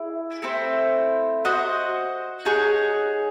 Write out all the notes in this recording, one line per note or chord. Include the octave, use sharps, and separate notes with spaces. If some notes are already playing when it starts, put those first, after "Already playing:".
Already playing: E4 G#4
A3 C4 E4 C5
F#4 C5 D#5 F#5
D#4 G#4 C#5 F#5